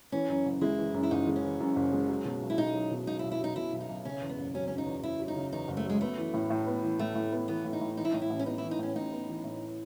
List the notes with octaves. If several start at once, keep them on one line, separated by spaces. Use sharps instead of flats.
E3 C#4
F#2
F#1
G#3 E4
E3
F#2
E4
F#1 D#4
G#3
C#4
E3
F#2
F#1
G#3
F#3
B2
B1
E4
B1 D#4
F#3
B2
B1 D#4
E4
B1
E4
F#3 D#4
B2 E4
B1
D#4
B1
C#3 C#4
E2
B3
F#1
F#3 C#4
C#3 C#4
D#4
E2
F#1 E4
F#3
D#4
C#3
E2 D#4
F#1
A3
F#3 G#3
A3 B3
E3
A2
A2
B3
E3
A2 A3
A2
B3
E3 B3
A2
D#4
A2
E3 D#4
E4
A2 D#4
E4
A1
C#4
B3 D#4
E4
E3
D#4
A2 C#4
A1 D#4
B3
E3
A2